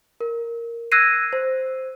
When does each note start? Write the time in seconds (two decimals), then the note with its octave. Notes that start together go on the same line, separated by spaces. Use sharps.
0.21 A#4
0.92 E6 F#6 G#6 A#6 C7 D#7
1.33 C5